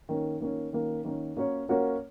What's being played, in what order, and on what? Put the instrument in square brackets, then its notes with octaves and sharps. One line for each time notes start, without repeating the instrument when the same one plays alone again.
[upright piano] D#3 A#3 C#4
D#3 A#3 C#4
D#3 A#3 C#4
D#3 A#3 C#4
A#3 C#4 F#4 A#4 C#5
A#3 C#4 F#4 A#4 C#5